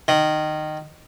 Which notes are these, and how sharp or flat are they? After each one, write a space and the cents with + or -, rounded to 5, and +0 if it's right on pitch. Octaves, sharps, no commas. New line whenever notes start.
D#3 -15